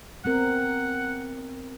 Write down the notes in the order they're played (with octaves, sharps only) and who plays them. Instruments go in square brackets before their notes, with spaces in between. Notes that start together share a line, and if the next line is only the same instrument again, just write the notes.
[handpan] B3 C4 A#4 [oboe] F#5